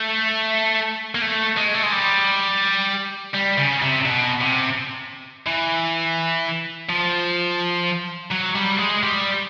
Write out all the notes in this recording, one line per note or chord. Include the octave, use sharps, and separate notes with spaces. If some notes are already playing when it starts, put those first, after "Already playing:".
Already playing: A3
A#3
A3
G#3
A3
G#3
G3
G3
C#3
C3
B2
C3
E3
F3
F#3
G3
G#3
G3